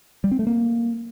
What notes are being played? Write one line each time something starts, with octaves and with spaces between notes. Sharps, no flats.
G3
C4
A3
A#3